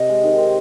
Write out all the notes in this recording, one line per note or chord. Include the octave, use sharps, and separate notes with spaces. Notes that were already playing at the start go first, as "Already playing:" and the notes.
Already playing: C3 C4 D#5
G#3
D#3
C4